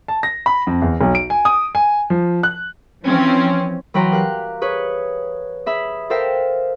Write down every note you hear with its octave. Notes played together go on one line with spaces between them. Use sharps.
A5
A#6
B5
F2
E2
B1
D7
G#5
D#6
G#5
F3
F#6
E3 F3 C4 C#4
E3 F#3 B4 G5 A#5 C6
G4 A#4 F5 F#6
G#4 B4 C#5
G#4 E5 B5
A4 A#4 C5 E5 F5 G5